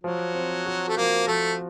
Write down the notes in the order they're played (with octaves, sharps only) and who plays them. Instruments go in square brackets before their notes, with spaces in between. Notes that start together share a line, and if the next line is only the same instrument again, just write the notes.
[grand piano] F3 [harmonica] F#3
[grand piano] C4
F#4
[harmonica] A3
[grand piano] F3 [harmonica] A#3
[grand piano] F3 [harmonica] A3